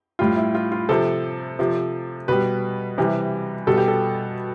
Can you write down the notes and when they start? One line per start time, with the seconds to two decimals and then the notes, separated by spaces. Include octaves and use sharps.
0.19 A2 G3 F4
0.36 E4
0.55 F4
0.72 F4
0.89 C3 F3 A4
1.59 C3 F3
2.28 B2 G3 B4
2.98 C3 E3 G3
3.67 B2 G3 A4
3.77 G4
3.88 A4